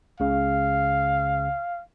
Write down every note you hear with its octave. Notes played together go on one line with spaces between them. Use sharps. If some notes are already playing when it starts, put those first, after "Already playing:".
C#2 C#3 F5